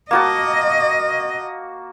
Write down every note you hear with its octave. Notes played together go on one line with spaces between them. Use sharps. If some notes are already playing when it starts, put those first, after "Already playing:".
A#3 F#4 D#5 A5